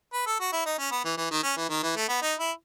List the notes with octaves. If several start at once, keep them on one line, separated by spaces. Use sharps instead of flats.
B4
A4
F#4
E4
D#4
C#4
B3
E3
E3
D#3
C#4
E3
D#3
E3
A3
B3
D#4
E4